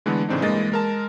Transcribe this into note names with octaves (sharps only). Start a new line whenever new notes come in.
D3 E3 G#3 A3 B3
A2 C#3 E3 C4 D4 D#4
G2 E3 G#3 A#3 D#5 A6
G#3 A#4 A5